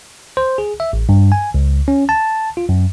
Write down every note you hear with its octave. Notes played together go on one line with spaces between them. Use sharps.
C5
G#4
E5
A1
G2
G#5
C#2
C#4
A5
F4
F#2